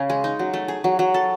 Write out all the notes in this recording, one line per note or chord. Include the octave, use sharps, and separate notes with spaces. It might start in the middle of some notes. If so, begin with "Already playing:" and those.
Already playing: C#3 G#4
G#3
D#4
F#3
A3
G#4
F#3
F#3
A4